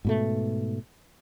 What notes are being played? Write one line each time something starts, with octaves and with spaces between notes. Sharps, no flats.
G#2 B2 A3